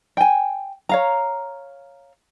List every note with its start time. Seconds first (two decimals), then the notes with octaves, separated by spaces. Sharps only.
0.17 G5 G#5
0.89 C#5 F5 A#5